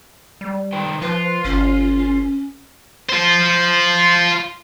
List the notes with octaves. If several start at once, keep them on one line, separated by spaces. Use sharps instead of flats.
G3
D#3 B4 G5
F3 F4 B4
G1 C#4
F4 C5